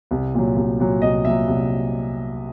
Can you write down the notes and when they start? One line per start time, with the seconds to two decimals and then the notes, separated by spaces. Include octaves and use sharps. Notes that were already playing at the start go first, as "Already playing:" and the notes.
0.11 C2
0.34 A#2 F#3
0.56 C2
0.80 A#2 F#3
1.02 C2 D#5
1.25 A#2 F#3 E5
1.48 C2